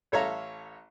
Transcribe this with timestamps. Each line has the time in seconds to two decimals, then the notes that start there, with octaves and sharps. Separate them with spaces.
0.12 A1 A4 C#5 E5 F5 A#5